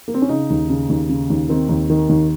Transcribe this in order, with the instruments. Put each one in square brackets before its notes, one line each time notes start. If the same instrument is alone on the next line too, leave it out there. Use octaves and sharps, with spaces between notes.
[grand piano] A#3
C4
C#4
C#3 D#4
D#2
C#3
D#2
C#3
D#2
D#3 C4
D#2
D#3
D#2